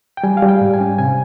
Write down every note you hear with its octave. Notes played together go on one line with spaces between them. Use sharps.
G5
G3 G#5
F5
G3
G5
G#2
G#5
C#4
C3 G#5